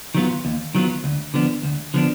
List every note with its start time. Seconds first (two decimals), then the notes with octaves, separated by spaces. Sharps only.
0.15 D#3 F#3 B3 F4
0.45 D#2
0.75 D#3 F#3 B3 F4
1.04 D2
1.34 D3 F3 B3 D4
1.63 D2
1.94 D3 F3 B3 D4